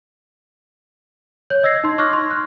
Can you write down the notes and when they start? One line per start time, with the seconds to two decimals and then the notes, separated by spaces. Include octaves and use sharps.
1.50 C#5 G6
1.63 D#5 E6 G#6 A#6 C7
1.84 D#4 C6
1.98 C#6 D6 F6 F#6 G#6 A#6
2.13 C6
2.31 F6 F#6